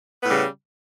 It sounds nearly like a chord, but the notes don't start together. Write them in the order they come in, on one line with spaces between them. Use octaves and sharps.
B3 A2 G3 C#3